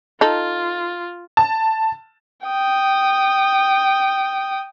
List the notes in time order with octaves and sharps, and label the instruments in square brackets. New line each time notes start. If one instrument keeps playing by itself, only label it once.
[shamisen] D#4 A4 [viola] F4
[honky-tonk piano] A5
[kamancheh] G5 D#6